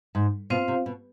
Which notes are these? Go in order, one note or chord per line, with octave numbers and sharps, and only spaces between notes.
G#2
B2 C4 F4 C5 F5
C3
B2